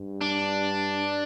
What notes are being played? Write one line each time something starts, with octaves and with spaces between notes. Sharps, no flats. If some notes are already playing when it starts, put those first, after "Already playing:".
Already playing: G2
D4